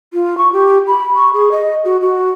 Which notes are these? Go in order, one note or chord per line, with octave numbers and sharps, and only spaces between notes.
F4
C#6
G4
B5
C#6
G#4
D#5
F#4
F#4